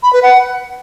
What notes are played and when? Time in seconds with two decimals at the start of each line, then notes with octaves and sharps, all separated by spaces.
0.03 B5
0.13 B4
0.23 F#5